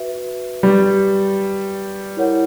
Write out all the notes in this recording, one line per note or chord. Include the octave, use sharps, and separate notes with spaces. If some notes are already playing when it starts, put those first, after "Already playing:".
Already playing: F#4 B4 E5
G3 B4 D5 G5 C#6
E4 A#4 C#5 F#5